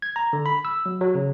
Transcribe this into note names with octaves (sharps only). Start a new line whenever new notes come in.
G#6
A#5
D3
B5
E6
F#3
F#3
C#3